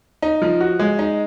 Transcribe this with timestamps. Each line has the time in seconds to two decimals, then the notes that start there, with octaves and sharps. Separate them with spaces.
0.22 D#4
0.42 F3
0.61 F#4
0.79 G#3
0.99 D#4